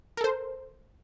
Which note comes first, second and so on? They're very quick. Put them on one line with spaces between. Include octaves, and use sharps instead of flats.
A#4 A4 C5